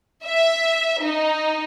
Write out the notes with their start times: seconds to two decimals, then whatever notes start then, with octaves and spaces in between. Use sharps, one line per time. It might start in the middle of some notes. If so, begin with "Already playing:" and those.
0.25 E5
1.02 D#4